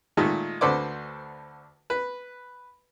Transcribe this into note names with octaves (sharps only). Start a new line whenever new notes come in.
A#2 D#3 G#3 A3
D2 D3 A4 B4 C5 D6
B4